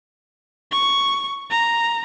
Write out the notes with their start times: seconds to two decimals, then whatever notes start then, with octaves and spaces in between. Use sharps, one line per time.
0.71 C#6
1.50 A#5